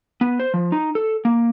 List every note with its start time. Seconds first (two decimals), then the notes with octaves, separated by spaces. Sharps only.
0.21 B3
0.40 C5
0.54 F3
0.72 D#4
0.95 A4
1.25 A#3